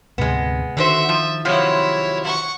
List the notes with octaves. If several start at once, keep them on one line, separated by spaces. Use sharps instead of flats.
D2 G#2 C3 G#3 B3
D3 D#3 F#4 C5 E5
F3
C3 F3 F#3 E4 C#5
F#5 C#6